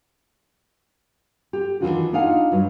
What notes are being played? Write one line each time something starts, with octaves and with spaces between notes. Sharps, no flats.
G4
D#2 C#3 E3 D4 F4 F#4
D4 D#4 F4 F5 F#5 G#5
G2 F#3